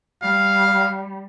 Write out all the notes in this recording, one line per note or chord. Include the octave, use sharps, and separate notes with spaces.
G3 F5